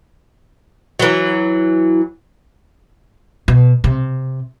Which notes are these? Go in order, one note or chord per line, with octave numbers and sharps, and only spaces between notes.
E3 F#3
B2
C3